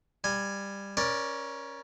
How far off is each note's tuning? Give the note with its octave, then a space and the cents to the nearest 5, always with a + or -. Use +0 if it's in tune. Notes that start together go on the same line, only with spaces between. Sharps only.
G3 +15 G#5 +0
C#4 +0 A#4 +30 D5 +0